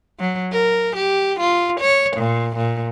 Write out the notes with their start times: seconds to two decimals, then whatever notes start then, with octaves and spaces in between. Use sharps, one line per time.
0.20 F#3
0.52 A#4
0.97 G4
1.40 F4
1.81 C#5
2.17 A#2
2.57 A#2